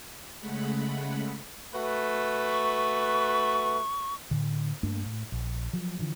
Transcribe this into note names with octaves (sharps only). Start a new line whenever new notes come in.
C#3 G#3 A3 F#5 B5
A3 F#4 B4
C#6
A2 D3
G2 A3 A#3 D4
A2
A#1
F3 F#3
D3 E3 F3